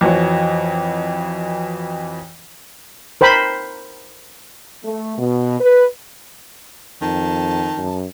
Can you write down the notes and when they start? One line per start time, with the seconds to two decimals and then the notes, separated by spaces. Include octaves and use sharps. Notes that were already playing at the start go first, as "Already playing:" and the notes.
0.01 F2 E3 F#4 C#5
3.21 A#4 C5 G5 B5
4.85 A3
5.18 B2
5.61 B4
7.01 F2 D#3 A5
7.77 F#2